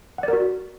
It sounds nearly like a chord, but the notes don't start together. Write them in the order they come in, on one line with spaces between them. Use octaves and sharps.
F#5 D5 A#4 F#4